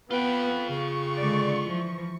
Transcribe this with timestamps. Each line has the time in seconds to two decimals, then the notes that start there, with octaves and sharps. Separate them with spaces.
0.11 B3 F4 B4 G5
0.69 C#3 C#6
1.19 D3 G#3 D5
1.65 E3 F3